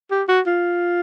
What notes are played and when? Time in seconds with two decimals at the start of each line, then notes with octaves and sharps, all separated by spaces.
0.11 G4
0.28 F#4
0.47 F4